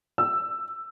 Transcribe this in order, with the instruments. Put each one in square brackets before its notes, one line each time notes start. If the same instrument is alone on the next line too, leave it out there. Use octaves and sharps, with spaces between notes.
[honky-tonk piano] E6